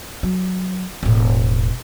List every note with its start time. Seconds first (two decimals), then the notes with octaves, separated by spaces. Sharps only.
0.23 F#3
1.03 E1 A2